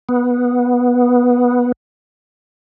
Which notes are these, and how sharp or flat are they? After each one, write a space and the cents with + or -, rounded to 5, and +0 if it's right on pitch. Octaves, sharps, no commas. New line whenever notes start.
B3 -10